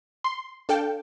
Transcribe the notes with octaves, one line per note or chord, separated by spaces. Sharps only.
C6
D4 A4 F5 G5